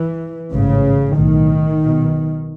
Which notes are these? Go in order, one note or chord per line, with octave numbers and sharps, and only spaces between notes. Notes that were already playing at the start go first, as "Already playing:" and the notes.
Already playing: E3
A1 G#2 C#3
B1 A2 D#3
B1 B2